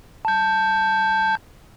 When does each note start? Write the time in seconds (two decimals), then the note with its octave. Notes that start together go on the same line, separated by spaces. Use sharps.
0.25 A5 G6